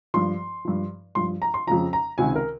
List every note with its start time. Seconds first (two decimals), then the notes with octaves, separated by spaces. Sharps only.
0.14 G2 F3 C6
0.65 G2 F3
1.15 G2 F3 C6
1.42 A#5
1.54 C6
1.67 F2 C#3 F3 A#5
1.93 A#5
2.18 C#2 C3 D#3 G#5
2.36 A#4